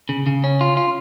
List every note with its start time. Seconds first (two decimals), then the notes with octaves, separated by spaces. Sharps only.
0.09 C#3
0.26 C#3
0.44 C#4
0.61 F4
0.77 F4